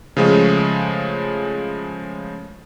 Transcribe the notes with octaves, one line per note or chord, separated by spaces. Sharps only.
C#3 F3 G#3 A3